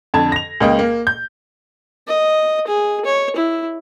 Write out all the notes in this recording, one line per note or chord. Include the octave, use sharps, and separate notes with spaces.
F2 D3 A5 G#6
A#6 F7
C#2 A#3 D#5 G5
A#3
G6
D#5
G#4
C#5
E4